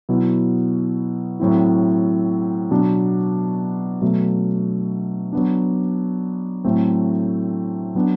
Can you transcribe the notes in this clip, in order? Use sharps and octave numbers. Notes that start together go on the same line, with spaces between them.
B2 F#3 B3 E4
A2 F#3 C4 E4
B2 F#3 B3 D4
B2 F#3 A3
F#3 B3 D4
A2 F#3 A3 C4
F#3 B3 D4